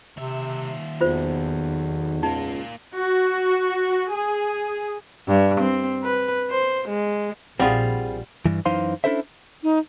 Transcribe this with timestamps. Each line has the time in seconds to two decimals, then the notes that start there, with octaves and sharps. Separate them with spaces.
0.17 D#2 C3 E5
1.01 B1 E2 F4 C5
2.23 C#2 A#3 D#4 F4
2.94 F#4
4.10 G#4
5.28 G2
5.60 C4
6.03 B4
6.51 C5
6.88 G#3
7.59 A#1 G3 C4 F4 G#4 F5 F#5 B5
8.46 G2 E3
8.65 F#2 E3 D#4 C5 F5 C6
9.04 C#4 D4 E4 A4 C5 E5
9.63 D#4